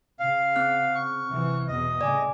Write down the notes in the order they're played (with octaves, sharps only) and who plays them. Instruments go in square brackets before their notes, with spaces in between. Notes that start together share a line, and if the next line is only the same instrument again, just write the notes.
[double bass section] C#3 [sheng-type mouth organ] F5
[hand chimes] C4 F6 F#6
[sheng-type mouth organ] C#6
[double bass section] C3 E3
[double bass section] E2 B2 B3 [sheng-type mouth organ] D#5
[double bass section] A2 C#3 [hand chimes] D5 G#5